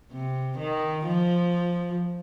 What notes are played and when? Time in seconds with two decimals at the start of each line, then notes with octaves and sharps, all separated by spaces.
0.11 C3
0.58 D#3
1.06 F3